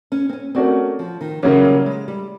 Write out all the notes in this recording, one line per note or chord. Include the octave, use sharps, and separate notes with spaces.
C#4
C4
C#4
A3 C4 C#4 F#4 A#4 D5
F3
D#3
C#3 E3 F#3 A#3 C#4
G3
G#3
G3